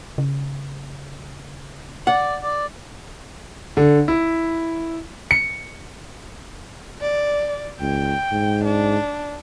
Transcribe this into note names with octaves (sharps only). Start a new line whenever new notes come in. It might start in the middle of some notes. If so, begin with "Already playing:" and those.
C#3
D5 F#5
D5
D3
E4
C#7
D5
C#2 G5
G#2
D4